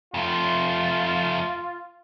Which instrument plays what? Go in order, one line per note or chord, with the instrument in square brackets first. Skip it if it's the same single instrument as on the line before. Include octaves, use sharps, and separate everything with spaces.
[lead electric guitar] F2 A3 [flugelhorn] F4